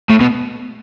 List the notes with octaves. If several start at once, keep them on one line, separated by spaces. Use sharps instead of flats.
A2
B2